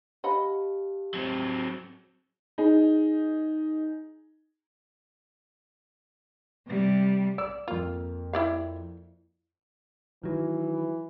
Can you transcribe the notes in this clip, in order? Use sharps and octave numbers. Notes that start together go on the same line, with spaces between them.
G4 D#5 F5 F#5 A5 B5
F#3 C4
D#4 G#4
C3 G3
D5 E6
F2 A#3 F4
E4 D5 F5
D#3 E3 F#3